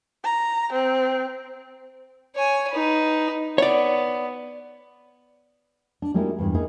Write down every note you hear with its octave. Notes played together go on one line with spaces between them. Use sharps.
A#5
C4
C#5 G#5
D#4 B4
B3 C#5 D5
D4
G3 G#3 A#3 D#4 E4 F#4
E2 G2 E3
A#3 D#4 E4 G#4